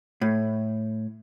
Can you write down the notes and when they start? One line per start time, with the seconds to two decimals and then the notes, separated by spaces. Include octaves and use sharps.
0.21 A2